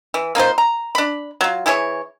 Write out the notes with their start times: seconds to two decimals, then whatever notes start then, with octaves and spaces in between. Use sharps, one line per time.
0.14 E3
0.35 A#3 D#4 F4 C5
0.58 A#5
0.95 D4 B5
1.41 F#3 F4
1.66 E3 E4 G#4 C#5